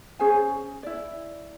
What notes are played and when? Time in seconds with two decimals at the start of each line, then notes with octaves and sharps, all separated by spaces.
0.19 C#4 G#4 C5 G#5
0.83 E4 D5